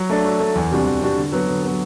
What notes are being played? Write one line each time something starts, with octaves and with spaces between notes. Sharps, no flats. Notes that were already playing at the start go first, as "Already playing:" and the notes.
Already playing: F#3
A3 D4 A4
F#3
A3 D4 A4
E2
C3 G3 D4 F#4
E2
C3 G3 D4 F#4
D3
F#3 B3
D3
F#3 B3